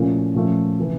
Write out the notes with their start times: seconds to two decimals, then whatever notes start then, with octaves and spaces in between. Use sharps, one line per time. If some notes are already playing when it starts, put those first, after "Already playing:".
Already playing: A#2 F3 A3 C#4 E4
0.34 A#2 F3 A3 C#4
0.79 C3 E3